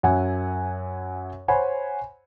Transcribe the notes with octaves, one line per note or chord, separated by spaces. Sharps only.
F#2 E5 F#5 G#5
C5 C#5 F#5 G#5 B5